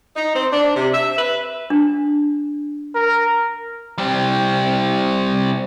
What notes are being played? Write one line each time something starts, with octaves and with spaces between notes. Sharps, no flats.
D#4
C4
D4
C3
E5
B4
D4
A#4
G3 C4